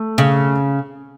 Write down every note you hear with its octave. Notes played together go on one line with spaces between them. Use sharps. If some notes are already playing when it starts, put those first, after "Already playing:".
Already playing: A3
C#3